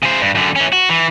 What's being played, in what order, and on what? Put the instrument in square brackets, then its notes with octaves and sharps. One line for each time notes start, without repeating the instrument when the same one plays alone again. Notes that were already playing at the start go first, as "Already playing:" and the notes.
[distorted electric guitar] C#3 C5
G2
F#2 D3
E3 C#4
F#4
E3